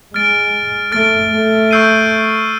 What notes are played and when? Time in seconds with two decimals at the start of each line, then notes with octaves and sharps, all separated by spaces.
0.14 G#3 F6 A6 D7
0.92 A3 F6 A6 D7
1.32 A3
1.71 C#6 E6 G6 C7 D#7